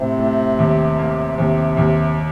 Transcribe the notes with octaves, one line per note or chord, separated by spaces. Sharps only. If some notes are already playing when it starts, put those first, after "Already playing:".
Already playing: A2 C3 A3 C4
A3
D#2
A#3
D#2 C3
D#2